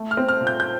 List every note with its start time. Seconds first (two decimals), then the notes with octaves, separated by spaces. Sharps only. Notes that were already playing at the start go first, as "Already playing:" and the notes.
Already playing: A3
0.11 F6
0.17 C4
0.29 F6
0.41 A#2
0.47 G6
0.60 G6